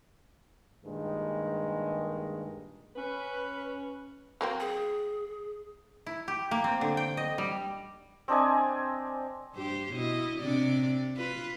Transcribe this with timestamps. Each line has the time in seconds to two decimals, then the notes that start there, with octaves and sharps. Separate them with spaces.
0.85 G2 A#2 D#3 G#3
2.96 C#4 B4
4.41 F#3 A#3 C4
4.60 G#4
6.06 E4
6.28 G4
6.51 A#3
6.64 C4
6.81 D3
6.97 G5
7.17 D#5
7.38 G3
8.28 C4 D4 D#5 G#5
9.55 G2 G4 C5
9.93 B2 E4 D#5
10.39 C3 D4 D5
11.16 F4 B4